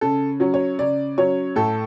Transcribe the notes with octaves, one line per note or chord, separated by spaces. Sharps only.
C#3 A4
F#3 C#4
C#5
C#3 D5
F#3 C#4 C#5
A2 A4